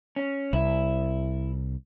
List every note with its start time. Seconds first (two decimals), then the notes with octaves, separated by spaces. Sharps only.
0.16 C#4
0.53 C2 E4